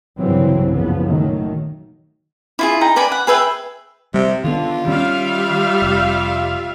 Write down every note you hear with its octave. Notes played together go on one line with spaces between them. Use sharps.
C2 G2 C#3 E3 F#3 C4
F#1 F3 B3
A#2 D#3 F#3 A3
E4 F4 G#4
D#4 G5 A#5
B4 D5 G#5 B5
F#5
G#4 B4 E5 G5
C3 G3
D3 D#3 B3 F4
D#3 G3 C#4 E5 F5
F1